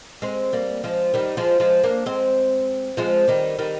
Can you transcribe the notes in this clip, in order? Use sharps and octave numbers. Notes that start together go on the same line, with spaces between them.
G#3 C4
G3 A#3
F3 G#3
D#3 G3
F3 G#3
F3 G#3
A#3 D4
G#3 C4
F3 G#3
D#3 G3
D#3 G3